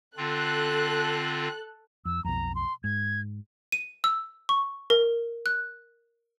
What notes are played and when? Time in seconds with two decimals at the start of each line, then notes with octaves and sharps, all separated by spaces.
0.17 D3 C4 F4 A4 F#6
2.05 F2 E6
2.25 B1 F2 A#5
2.55 C6
2.84 G#2 G#6
3.72 D#7
4.04 E6
4.49 C#6
4.90 A#4
5.46 F#6